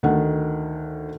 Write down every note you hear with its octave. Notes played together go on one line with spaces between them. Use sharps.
D2 D#3 F#5